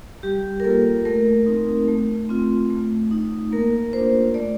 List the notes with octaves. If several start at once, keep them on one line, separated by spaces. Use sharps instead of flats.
G3 G4
A#4
A#3 F4 A4
A3 A#4
C4 D#4
A3
C4 F4
A3
D#4
A#3 A#4
D4 F4 C5
A3 D5